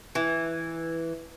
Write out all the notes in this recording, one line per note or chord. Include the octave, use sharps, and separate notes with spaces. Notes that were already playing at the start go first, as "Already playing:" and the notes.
E3